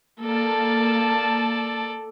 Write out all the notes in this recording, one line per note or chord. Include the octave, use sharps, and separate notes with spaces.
A#3 A4 D5 A5